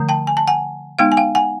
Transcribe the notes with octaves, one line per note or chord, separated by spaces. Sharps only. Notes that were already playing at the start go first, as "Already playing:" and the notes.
Already playing: D3 F3 A3
G5 A5
G#5
A5
F#5 G#5
G#3 B3 D#4 F5 G5
G#5
F5 G5
F#5 G#5